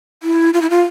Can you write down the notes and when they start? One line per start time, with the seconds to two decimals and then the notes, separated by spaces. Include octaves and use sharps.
0.23 E4
0.53 F4
0.62 E4
0.70 F4